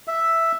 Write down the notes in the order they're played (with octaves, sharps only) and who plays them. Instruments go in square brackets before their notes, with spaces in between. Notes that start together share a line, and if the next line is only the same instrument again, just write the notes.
[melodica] E5